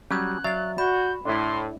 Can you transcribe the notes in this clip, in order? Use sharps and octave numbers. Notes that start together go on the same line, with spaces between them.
F#3 G3 C#4 F#6 G#6
F#3 D5 E5 F5 A6
F#4 D5 B5 G6
A2 D4 E4 C6